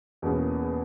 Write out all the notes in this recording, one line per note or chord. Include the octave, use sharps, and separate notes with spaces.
E2 B2 A#3 C#4 G#4